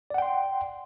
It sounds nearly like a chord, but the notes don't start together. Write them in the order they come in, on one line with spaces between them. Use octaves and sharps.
D5 F#5 G5 C6